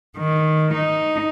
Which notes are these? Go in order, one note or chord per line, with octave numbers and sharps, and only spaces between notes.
D#3
D#4